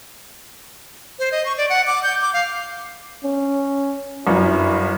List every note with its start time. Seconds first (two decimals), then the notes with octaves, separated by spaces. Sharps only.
1.19 C5
1.32 D#5
1.45 C#6
1.58 D5
1.70 F#5
1.87 D6
2.03 G6
2.21 D6
2.34 F5
3.24 C#4
4.27 G1 F#2 E4